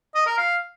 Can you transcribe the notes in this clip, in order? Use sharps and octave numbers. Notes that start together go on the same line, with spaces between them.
D#5
A#4
F5